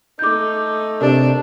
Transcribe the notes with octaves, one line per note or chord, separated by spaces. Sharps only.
A3 D#4 D6 G6
C3 D4 A#4